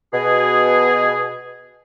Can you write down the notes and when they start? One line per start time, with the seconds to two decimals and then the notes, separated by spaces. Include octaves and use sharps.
0.14 B2 G#4